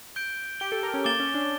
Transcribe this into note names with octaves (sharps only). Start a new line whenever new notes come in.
G6 D7 G7
G4 G6 D7 G7
A4
A#4
C#4
A#3 D6 A6 E7 G7
C#4
D4